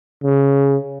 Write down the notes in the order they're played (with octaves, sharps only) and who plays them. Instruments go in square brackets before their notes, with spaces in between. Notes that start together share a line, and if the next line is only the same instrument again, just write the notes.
[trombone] C#3